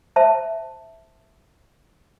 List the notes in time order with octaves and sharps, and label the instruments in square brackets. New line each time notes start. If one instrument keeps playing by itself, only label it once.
[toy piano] C5 E5 A5